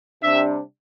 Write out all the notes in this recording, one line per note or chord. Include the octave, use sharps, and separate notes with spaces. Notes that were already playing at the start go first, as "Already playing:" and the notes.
C3 G3 D4 E5